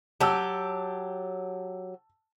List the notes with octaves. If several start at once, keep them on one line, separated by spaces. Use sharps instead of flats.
F#3 G4 A5 E6